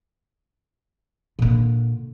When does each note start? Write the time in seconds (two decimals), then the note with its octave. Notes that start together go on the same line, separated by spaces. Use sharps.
1.39 A#2 D3